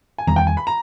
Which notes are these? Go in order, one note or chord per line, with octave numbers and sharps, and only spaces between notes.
G#5
E2 D#3 G3 A#5
G5
G#5
B5
A#5